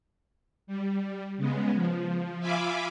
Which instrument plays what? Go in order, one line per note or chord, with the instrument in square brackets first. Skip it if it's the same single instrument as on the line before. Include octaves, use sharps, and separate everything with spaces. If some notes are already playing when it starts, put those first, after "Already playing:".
[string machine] G3
C#3 G#3 B3
F3
F4 E5 F5 G#5 B5 D6